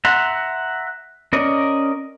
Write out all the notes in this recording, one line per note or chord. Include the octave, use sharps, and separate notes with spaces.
E5 F#5 A#5 C6
C#4 A#4 D5 D#5